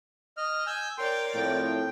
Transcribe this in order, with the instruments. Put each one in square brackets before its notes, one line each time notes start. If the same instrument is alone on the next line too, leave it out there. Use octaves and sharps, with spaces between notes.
[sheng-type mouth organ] D#5 F6
G#5 E6 G6
[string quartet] A#4 C#5 D5 [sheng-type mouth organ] G5 C6
[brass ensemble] A2 F3 C4 [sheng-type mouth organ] G5